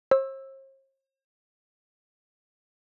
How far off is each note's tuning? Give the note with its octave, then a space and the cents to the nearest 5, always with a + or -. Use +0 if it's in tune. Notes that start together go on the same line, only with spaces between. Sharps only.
C5 +45 E6 +0